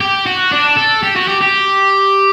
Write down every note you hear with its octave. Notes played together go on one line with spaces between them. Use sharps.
G4
F#4
D4
A4
G4
F#4
G4
G4